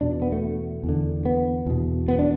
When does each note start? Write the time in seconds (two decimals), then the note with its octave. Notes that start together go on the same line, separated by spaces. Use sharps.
0.01 E2 B2 D4
0.22 B3
0.32 A3
0.84 E2
0.89 D3
1.25 B3
1.66 E2 B2
2.08 B3
2.19 D4